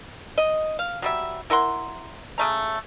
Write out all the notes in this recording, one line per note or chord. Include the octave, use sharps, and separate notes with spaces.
D#5
F5
F#3 G3 E5
E4 A#4 F#5 C6
C#3 A3 A#5